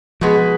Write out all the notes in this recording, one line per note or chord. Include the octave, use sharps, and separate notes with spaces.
B2 F3 G#3 B3